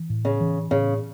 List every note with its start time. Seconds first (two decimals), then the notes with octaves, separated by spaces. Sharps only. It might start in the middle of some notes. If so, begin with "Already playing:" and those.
Already playing: E3
0.10 A2
0.25 C#3
0.40 E3
0.71 A2 C#3